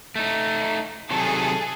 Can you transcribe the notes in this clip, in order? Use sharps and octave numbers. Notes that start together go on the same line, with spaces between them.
A3 D#4
C3 D#3 F#3 G#4 A4